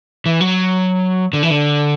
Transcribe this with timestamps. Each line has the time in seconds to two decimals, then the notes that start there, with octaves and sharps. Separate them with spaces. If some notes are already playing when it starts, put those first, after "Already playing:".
0.26 E3
0.41 F#3
1.33 D3
1.43 E3
1.51 D3